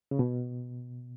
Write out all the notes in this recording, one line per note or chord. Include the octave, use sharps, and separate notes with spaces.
C#3
B2